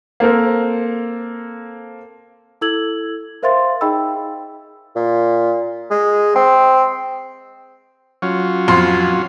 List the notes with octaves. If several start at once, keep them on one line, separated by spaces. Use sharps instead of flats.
A#3 C4 A4 A#4 C5
E4 A4 E6 G#6 F#7
A#4 C5 E5 F5 C6 A6
D#4 G#4 D#5 G5 B5 E6
A#2
G#3
C4
F#3 C#4 F4
F2 F5 C6